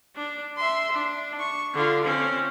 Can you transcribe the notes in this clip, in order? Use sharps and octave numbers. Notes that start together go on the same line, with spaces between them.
D4
E5 C6
D4
C#6
D3 F4
C4 C#4